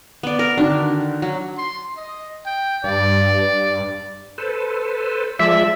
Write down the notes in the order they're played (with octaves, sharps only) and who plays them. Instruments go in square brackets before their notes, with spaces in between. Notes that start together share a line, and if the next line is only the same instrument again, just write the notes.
[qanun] B3 D5
A#4
[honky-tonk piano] D3 D#3 F#4 [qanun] D4
[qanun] F#3
[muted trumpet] C6
D#5
G5
[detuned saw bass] G2 [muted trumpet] D5
[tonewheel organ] A4 B4 C5
[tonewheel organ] F3 G#3 D5 [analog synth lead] E5